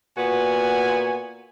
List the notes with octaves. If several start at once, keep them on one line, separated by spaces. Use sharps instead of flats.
A#2 B3 F#4 G#5